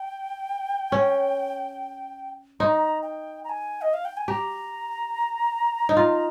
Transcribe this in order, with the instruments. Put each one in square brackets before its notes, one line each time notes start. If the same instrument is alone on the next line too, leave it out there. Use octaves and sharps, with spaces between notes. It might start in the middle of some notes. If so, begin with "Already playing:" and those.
Already playing: [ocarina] G5
[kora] C#4
[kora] D#4 [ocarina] A#5 C6
[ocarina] G5
A#5
G#5
D#5
F5
G5
G#5
[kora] G4 [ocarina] A#5
[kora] D#4
F4